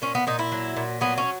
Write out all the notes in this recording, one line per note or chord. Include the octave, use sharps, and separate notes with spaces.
A#2 C#4
B3
A#2 D#4
E4
F#3
A#2
F#3 B3
C#4